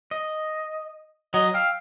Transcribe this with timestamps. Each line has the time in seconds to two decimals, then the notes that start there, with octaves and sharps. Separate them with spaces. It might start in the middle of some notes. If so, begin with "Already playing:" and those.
0.11 D#5
1.34 F#3 D#5
1.54 F5 G5 E6